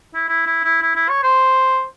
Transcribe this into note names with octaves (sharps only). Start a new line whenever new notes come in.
E4
E4
E4
E4
E4
E4
C#5
C5